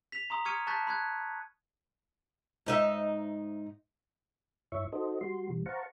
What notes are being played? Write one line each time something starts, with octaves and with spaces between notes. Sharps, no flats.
B6 F7
A#5 C6 D#6
C#6 D#6 F6 G#6 C#7 D#7
A5 C#6 F#6 G6 A6 B6
B5 F#6 G#6
G#2 D#4 E5
G2 E4 C#5 E5 C#6
D#4 F#4 A4 C5 D#5
G3 F#4 C6
B2 E3 G3
C5 F5 F#5 A5 A#5 C#6